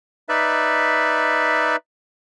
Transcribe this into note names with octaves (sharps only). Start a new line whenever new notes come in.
D#4 B4 D5 E5